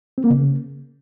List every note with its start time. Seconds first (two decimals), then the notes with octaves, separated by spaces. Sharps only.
0.18 C4
0.24 A#3
0.30 C#3